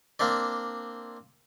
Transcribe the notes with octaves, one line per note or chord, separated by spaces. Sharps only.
A#3 C4 D4 D5